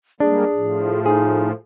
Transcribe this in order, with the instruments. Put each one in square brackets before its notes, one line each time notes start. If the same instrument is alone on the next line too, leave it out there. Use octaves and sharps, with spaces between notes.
[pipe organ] G3 G#3 A#3 [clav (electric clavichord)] D4 [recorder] G#4
[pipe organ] A2 F3
[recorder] D#4 [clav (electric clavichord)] G#4